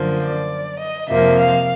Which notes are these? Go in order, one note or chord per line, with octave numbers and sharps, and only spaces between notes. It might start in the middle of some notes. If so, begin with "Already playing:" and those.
Already playing: F#2 D3 F3 A#3
D5
D#5
F2 C3 F3 A#3 E5
F5